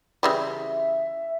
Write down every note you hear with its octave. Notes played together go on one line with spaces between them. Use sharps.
C#3 E3 G3 E5